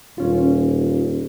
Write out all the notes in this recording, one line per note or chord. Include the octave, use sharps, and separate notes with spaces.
D#1 C#4 F4